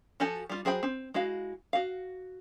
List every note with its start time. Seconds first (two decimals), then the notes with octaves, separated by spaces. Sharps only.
0.20 F3 F#4 G4 A4 G#5
0.49 G3 F4
0.65 F#3 G#4 C5 G5 B5
0.83 C4
1.14 G#3 E4 F#4 F5
1.73 F#4 F5